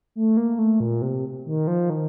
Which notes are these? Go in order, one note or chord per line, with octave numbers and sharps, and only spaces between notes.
A3
A#3
A3
A#2
C3
D#3
F3
D#3